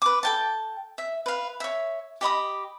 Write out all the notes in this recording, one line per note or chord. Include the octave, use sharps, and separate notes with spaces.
B4 D6
A4 G5 A5
E5
B4 F5
C#5 E5
G4 D#5 B5 D#6